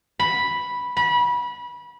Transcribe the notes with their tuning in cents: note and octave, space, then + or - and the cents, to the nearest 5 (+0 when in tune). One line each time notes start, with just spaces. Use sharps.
B5 -5
B5 -25